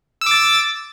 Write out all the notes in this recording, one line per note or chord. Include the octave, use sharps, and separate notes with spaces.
D6 E6 A6